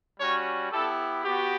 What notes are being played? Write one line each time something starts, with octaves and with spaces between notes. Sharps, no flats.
G3 C#4 F#4 C#5
B3 E4 G4 A4
B3 F#4 G4